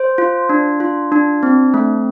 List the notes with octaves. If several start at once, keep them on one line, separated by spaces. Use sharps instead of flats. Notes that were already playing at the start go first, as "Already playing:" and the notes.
Already playing: C5
F4
D4
F4
D4
C4
A3